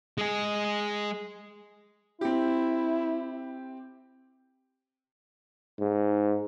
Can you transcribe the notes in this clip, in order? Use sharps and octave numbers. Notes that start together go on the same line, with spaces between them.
G#3 G#4
C4 E4 G4
G#2